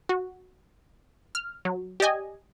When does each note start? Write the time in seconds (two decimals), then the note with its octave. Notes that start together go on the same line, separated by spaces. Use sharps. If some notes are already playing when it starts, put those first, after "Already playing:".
0.09 F#4
1.35 F6
1.65 F#3
2.00 G4 D5 D#5 G#5